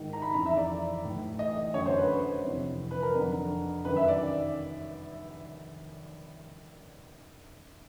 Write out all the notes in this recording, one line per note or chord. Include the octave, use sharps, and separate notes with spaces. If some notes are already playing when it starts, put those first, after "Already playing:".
Already playing: G#2 D#3
A#5
B5
F2 C#3 E3 A#5
E5
D5
A2 E3
D#5
F#2 D3 C#5
C5
B4
F2 C3 E3
B4
A#4
F2 D3
F#2 D#3 B4
E5
D5